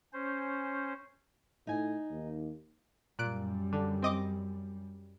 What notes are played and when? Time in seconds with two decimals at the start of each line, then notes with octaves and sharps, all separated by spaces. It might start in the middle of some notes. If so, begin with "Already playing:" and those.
0.13 C#4 C5
1.67 A2 D#4 G#5
2.10 D#2
3.19 F#2 A#2 G3 F#6 D7
3.73 D3
4.03 C4 D#5 D6